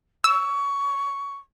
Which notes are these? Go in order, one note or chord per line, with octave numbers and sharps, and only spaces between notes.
C#6 E6